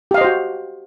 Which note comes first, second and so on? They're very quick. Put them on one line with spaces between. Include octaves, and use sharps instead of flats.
G4 F5 D#5 C5 F#4